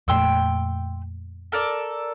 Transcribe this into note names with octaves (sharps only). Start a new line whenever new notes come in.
F2 A#2 A3 G5 C6 E6
A4 A#4 D5